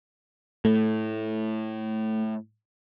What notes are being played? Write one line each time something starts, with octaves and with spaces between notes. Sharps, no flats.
A2 A3